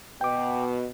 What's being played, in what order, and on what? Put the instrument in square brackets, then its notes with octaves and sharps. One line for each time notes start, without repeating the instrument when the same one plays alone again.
[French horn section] B2 [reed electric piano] G5 D6